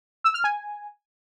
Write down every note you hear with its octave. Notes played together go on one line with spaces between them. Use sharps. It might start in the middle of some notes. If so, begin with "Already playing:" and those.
E6
F6
G#5